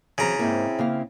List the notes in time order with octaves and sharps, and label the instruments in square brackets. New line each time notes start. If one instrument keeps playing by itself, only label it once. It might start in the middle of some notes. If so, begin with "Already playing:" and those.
[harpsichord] C#3 A#5 [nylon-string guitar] E3 F#3 C4
[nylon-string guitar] G#2 A#3 [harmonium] C4 E4
[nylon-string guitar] C#3 A#3 F5